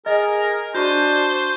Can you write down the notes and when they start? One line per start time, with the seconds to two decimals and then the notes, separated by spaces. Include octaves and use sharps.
0.06 G#4 A#4 D#5
0.75 D4 F#4 C5 C#6 G6